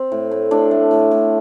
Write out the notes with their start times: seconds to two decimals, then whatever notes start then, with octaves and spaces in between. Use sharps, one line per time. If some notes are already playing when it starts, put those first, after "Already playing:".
Already playing: C4
0.12 A2
0.31 A2
0.51 A2 D4
0.71 A3
0.91 A2
1.11 A2